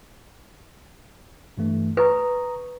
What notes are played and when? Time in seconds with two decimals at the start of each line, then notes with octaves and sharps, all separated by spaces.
1.58 G2 E3 A3
1.97 B4 A#5 C#6 D#6